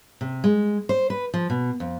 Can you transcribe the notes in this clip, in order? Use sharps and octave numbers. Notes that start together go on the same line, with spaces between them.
C3
G#3
C5
B4
F3
B2
F2